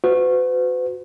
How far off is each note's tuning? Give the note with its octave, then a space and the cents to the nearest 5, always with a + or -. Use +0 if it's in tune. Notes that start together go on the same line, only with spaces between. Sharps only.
F#4 -20 B4 +45